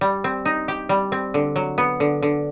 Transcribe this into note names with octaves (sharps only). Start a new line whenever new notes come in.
G3
C4
D#4
G4
G3
C4
D3
F#3
B3
D3
D3